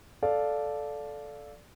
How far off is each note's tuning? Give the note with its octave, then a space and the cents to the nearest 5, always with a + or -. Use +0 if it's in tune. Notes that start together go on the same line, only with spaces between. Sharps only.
A4 -10 D5 +0 F5 +0